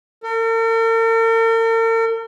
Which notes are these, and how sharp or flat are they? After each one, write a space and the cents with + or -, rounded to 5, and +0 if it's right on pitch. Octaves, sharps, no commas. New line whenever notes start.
A#4 -45